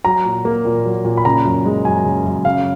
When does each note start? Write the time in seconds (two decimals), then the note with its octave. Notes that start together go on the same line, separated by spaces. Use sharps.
0.05 F#3 A#5
0.25 A#2
0.45 A#3
0.65 A#2
0.85 F#3
1.05 A#2
1.17 B5
1.25 C#3 A#5
1.45 F#2
1.65 G#3
1.85 F#2 G#5
2.05 C#3
2.26 F#2
2.45 C#3 F5